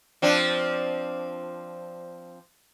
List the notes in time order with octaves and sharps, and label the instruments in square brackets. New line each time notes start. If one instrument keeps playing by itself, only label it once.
[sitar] F3 C4 D4